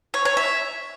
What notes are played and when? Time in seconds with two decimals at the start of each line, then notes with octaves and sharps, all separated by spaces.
0.14 C#5
0.25 C#5
0.37 E5